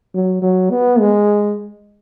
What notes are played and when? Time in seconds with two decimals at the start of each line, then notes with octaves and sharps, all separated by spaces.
0.14 F#3
0.42 F#3
0.70 B3
0.99 G#3